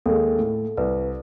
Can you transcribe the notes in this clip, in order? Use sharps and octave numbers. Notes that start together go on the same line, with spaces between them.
D#2 G#3 A4
A2
C2 B4